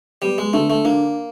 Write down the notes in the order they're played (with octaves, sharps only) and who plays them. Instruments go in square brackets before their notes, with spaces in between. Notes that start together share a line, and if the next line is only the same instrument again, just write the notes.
[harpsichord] G3 [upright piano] B3
[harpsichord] G#3
[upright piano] D3 [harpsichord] A3
[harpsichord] A3
[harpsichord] A#3 [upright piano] D4